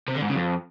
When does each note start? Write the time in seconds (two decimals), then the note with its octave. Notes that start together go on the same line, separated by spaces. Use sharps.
0.08 C3
0.15 D3
0.22 G#2
0.29 C#3
0.36 F2